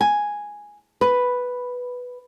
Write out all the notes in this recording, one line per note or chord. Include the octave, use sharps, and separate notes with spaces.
G#5
B4